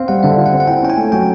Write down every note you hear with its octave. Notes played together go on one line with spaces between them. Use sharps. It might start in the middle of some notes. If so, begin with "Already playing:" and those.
Already playing: C4 F5
G3 F#5
D3 E5
F4
F#5
C4
F#5
E4 G5
C#4 G5
G#5
A3
F#3 G5